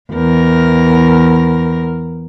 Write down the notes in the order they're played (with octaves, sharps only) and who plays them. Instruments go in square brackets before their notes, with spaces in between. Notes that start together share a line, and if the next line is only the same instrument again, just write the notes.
[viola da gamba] E2 A#4